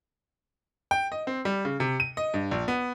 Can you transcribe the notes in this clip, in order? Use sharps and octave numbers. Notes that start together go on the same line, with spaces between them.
G5
D#5
C4
G3
C#3
C3
D#7
D#5
G2
A#1
B3